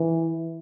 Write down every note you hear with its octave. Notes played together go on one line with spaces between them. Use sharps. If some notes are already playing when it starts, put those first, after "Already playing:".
Already playing: E3